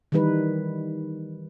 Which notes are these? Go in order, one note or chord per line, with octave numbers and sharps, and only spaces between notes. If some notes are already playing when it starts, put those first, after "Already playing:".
D#3 E3 G3 D#4 B4